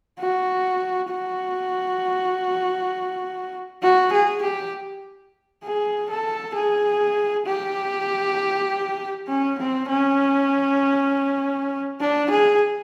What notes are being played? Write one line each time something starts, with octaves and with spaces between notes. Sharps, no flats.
F#4
F#4
F#4
G#4
G4
G#4
A4
G#4
G4
C#4
C4
C#4
D4
G#4